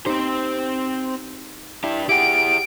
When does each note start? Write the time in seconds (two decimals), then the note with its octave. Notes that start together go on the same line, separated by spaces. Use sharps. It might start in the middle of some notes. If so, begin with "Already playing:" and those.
0.06 C4 D#4 G4 C5
1.84 D4 E4 G4
2.09 E4 G4 G#4 F#5 G5 D7